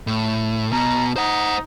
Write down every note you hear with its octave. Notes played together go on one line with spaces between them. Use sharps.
A2
B2 A#5
D#4 C5 F#5